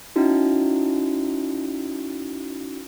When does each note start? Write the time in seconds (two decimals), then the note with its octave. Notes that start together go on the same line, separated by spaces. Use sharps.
0.16 C#4 D#4 E4 F#4